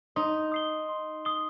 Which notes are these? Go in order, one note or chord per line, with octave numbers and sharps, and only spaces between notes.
D#4 C6
D#6 C7 G7
C6
D#6 C7 G7